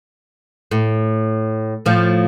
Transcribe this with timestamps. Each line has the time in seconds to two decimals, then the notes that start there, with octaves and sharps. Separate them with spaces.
0.71 A2
1.86 A2 F3